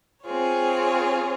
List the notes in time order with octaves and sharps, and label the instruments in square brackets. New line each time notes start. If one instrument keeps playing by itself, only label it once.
[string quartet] C4 F4 G#4 C#5